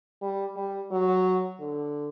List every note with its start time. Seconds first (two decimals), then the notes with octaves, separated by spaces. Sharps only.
0.22 G3
0.57 G3
0.91 F#3
1.60 D3